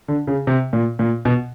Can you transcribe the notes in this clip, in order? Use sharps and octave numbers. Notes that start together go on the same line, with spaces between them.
D3
C#3
C3
A#2
A#2
B2